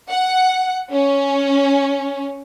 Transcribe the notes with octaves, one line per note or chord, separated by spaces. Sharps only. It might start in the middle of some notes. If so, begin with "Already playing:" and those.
F#5
C#4